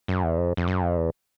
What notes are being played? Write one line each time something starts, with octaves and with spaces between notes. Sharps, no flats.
F#2
E2
F2
F2
F#2
F2
E2